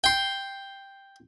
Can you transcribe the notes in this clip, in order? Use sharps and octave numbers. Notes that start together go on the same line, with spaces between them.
G5 C6